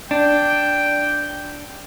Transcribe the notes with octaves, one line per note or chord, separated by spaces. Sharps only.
D4 G5